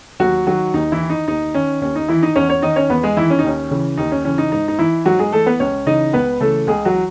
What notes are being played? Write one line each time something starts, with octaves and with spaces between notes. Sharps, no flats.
D#2 F#3 F#4
D#3 F#3 F#4
D#2 D#4
E3 E4
D#3
D#4
D#2 D#4
D#3 C#4
D#2 C#4
D#4
D#3 E3 E4
D#4 D#5
E2 C#4 C#5
C#4 C#5
D#3 D#4 D#5
C#4 C#5
E2 B3 B4
G#3 G#4
D#3 E3 E4
C#4
D#4
D#2 C#4
C#3 E3
D#2 D#4
C#4
C#3 E3 C#4
D#4
G#2 D#4
D#4
E3 E4
G#2 F#3 F#4
G#3 G#4
E3 A3 A4
B3 B4
C#2 C#4 C#5
C#3 E3 D#4 D#5
C#2 B3 B4
C#3 E3 A3 A4
C#2 G#3 G#4
F#3 F#4
E3